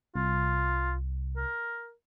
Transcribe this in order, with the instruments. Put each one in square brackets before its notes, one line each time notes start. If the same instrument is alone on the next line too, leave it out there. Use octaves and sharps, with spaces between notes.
[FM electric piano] C2 [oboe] F4
[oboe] A#4